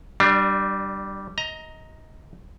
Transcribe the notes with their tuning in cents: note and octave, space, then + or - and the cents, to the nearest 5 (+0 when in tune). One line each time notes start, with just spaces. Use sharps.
G3 -10 D4 +25
D#5 +25 A#5 +0